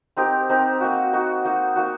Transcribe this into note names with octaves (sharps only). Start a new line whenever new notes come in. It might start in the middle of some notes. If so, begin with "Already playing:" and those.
C4 D#4 G4 A#4
C4 D#4 G4 A#4
A#3 D#4 F#4
A#3 D#4 F#4
A#3 D#4 F#4
A#3 D#4 F#4